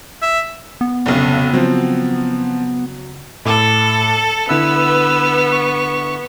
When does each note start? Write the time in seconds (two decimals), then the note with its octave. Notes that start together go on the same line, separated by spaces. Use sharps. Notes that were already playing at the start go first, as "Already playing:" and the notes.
0.22 E5
0.81 B3
1.06 F1 B1 C#3 C#4 E5
1.54 F3 F#3 C4
3.45 A2 A4 D6
4.49 D3 B3 E4 B4 E6
5.52 C#6